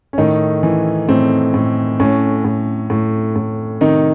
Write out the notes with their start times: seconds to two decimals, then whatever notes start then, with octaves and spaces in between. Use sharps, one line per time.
0.13 C#4
0.18 A2 D#3 D#4
0.63 E3
1.09 A2 C4
1.54 A2
2.00 A2 C#4
2.45 A2
2.90 A2
3.36 A2
3.81 C3 D#3 D#4